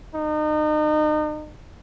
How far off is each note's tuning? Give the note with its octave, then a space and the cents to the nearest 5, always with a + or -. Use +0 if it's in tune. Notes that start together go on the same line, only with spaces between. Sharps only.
D#4 -35